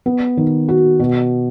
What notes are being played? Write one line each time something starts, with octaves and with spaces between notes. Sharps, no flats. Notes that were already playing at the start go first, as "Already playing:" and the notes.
B3
D#3
F#4
B2